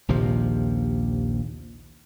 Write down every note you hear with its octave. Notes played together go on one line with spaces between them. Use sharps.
A#1 D#2 C3 F3